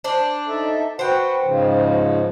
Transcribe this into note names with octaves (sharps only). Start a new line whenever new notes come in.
D4 C5
D#4 A4 E5
F#4 B4 C5 F#5 G5
G#2 C#3 F3